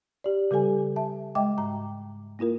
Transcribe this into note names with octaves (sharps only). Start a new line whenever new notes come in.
G4 D5
C#3 G3 G4 A4 G#5
E5 A5
G#3 D#5 E5 G5 D6
G#2 A#5
A#3 E4 F4 A#4